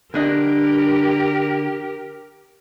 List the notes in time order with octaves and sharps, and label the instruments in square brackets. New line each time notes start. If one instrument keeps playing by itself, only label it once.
[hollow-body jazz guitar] D3 D4 D#5 [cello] G4 A#4